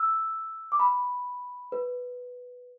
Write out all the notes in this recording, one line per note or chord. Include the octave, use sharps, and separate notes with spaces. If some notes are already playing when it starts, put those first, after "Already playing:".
Already playing: E6
D6
B5
B4